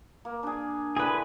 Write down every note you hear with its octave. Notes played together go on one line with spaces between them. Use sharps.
A#3
D4 G#4
D3 E3 G#4 B4